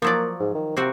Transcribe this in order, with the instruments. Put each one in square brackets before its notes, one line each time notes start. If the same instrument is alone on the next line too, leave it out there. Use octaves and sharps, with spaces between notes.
[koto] F3 F#3 D5 [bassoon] A#3
[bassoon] G#2
D#3
[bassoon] C3 [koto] A#3 C4 F#4